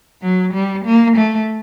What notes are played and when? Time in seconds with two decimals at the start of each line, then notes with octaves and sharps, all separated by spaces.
0.22 F#3
0.53 G3
0.85 A#3
1.17 A3